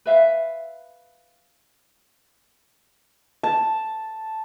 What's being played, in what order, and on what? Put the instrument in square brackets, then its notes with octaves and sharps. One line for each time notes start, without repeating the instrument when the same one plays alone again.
[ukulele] B4 E5 F5
[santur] A5